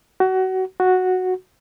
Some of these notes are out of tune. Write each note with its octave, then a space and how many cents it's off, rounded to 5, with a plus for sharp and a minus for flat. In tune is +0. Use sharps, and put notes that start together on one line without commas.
F#4 +25
F#4 -5